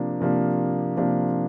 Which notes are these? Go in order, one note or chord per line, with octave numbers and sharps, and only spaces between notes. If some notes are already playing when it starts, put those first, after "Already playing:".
Already playing: C3 F3 A#3 D4
C3 F3 A#3 D4
C3 F3 A#3 D4